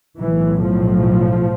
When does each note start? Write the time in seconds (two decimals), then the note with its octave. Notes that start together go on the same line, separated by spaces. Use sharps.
0.18 B1 A2 E3
0.64 F3